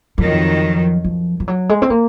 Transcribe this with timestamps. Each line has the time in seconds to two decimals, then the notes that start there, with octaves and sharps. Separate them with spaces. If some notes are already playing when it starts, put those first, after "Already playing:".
0.18 F2 D#3 F3 F#3
1.04 F3
1.40 F3
1.48 F#3
1.69 G#3
1.82 C4
1.90 A#3